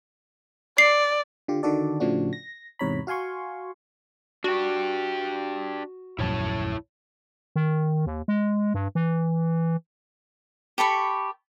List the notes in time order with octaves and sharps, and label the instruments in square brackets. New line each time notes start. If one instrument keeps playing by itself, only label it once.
[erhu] D5 [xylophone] C7
[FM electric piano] D3 F4 G4
D3 D#3 F#4 A4 D5
A2 C#3 F3 A3 D4 F#4
A#6
E2 G#2 C3 C#5 A#5 B5
F#4 F5 G#5 C6 C#6
[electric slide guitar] D4 G4 [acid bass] F#4
[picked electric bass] D#1 A#1 F#2 [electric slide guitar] E4 C#5 A5
[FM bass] D#3
D#2
G#3
G2
E3
[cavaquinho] G4 A4 B5 C#6